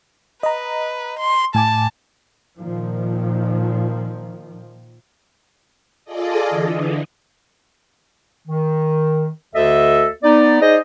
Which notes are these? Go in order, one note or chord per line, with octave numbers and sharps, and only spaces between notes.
B4 D#5 A#5
C6
A2 G#5 A5 D6
A#2 D#3 F3
F4 G#4 A4 D5 D#5
D3 E3
D#3
D2 D3 A4 D#5 E5
B3 D#4 D5
D#4 G#4 C5 D5 D#5